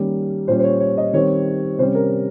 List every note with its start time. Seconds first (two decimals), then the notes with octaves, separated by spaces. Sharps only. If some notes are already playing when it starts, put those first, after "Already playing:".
Already playing: D#3 G3 A#3 C#4
0.48 A#2 G3 C#4 C5
0.59 C5
0.64 C#5
0.80 C#5
0.98 D#5
1.13 D#3 G3 C4 C#5
1.79 C3 G3 C#4 C5
1.95 A#4